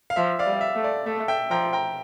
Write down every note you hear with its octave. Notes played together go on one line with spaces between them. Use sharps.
F5
F3 E5
D5 F5
G3
E5
A3
D5
A3 E5
E5 G5
F3 G5 A#5
G5 A#5